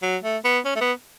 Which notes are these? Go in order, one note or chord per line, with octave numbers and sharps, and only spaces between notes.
F#3
A3
B3
C#4
A3
B3